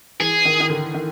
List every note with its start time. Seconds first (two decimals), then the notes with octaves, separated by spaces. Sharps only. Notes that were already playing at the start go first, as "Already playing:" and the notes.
0.20 E3 G#4
0.45 D#3
0.60 D#3
0.70 D3
0.95 D#3